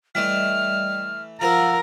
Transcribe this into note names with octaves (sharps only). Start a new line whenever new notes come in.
E3 G3 A3 D5 D#5 F6
F3 A#4 F5 F#5 E6